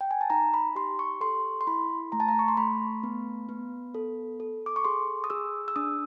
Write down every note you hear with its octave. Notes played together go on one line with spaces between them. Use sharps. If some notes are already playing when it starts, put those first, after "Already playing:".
G5
G#5
A5
D#4 A#5
B5
G4 C6
C#6
A4 C6
C6
E4 B5
A3 A#5
A5
A#5
C#6
C6
A3 B5
B3
B3
A4
A4
D6
C#6
G#4 C6
D#6
G#4 E6
E6
D4 D#6